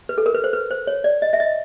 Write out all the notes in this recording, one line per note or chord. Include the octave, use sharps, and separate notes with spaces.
B4
A4
A#4
B4
C5
B4
C5
C#5
D5
D#5
E5
D#5